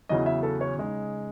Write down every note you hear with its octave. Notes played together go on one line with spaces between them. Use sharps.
E2 C#3 F#3 C#4 E4 D#5
E5
A4
C#5
C#3 G#3 D#4